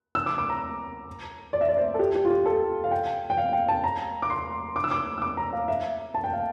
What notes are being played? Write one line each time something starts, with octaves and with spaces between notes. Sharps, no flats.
E6
D6
D6
A#5
D5
E5
D5
C5
A4
G4
G4
F4
G4
A4
F5
G5
G5
F5
G5
A5
A#5
D6
C6
D6
E6
D6
E6
D6
A#5
F5
E5
A5
G5
F5